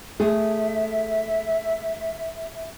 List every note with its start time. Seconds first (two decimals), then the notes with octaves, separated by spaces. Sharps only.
0.20 A3 G#4 E5